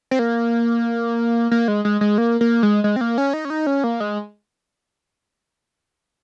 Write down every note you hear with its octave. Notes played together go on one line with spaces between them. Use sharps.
C4
A#3
A#3
G#3
G#3
G#3
A#3
A#3
G#3
G#3
C4
A#3
C#4
D#4
C#4
D#4
C#4
A#3
G#3